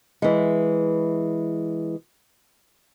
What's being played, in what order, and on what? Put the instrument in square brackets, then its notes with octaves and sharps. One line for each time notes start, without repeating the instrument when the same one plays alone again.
[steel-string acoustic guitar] E3 G#3